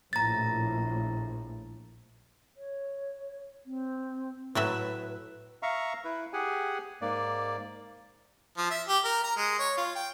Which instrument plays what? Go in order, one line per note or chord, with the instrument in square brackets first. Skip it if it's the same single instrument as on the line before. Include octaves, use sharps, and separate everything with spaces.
[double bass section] A#1 A2 [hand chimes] A#5 A6
[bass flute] C#5
C4
[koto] A2 F#3 E5 [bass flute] B4
[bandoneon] E5 F5 A#5 C#6
E4 B4
G4 G#4 F#5 G#5
G#2 A#3 D5
[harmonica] F3
E5
G4
A#4
A#5
G#3
C#5
F4
G5